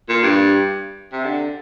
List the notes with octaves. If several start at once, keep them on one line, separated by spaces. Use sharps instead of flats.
A#2
G2
C3
D3